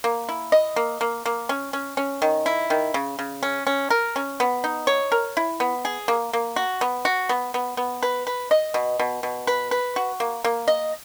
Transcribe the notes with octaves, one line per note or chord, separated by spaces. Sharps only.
A#3
E4
D#5
A#3
A#3
A#3
C#4
C#4
C#4
D#3
E4
D#3
C#3
C#3
C#4
C#4
A#4
C#4
B3
D#4
C#5
A#4
E4
B3
G#4
A#3
A#3
F#4
B3
F#4
B3
B3
B3
B4
B4
D#5
B2
B2
B2
B4
B4
F#4
A#3
A#3
D#5